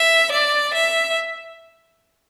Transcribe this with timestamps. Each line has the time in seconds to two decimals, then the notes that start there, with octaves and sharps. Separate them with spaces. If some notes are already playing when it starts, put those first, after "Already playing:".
Already playing: E5
0.31 D5
0.74 E5